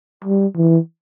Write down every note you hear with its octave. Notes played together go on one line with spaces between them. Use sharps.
G3
E3